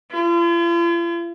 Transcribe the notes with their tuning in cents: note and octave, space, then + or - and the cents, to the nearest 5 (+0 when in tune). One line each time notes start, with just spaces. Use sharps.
F4 -45